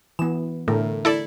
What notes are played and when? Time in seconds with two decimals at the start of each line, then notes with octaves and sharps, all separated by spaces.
0.19 E3 B3 E7
0.68 A2 D3 A3 A#4
1.05 E4 A4 D5